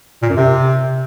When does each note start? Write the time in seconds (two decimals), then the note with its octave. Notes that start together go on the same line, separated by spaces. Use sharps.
0.22 A#2
0.30 F#2
0.37 C3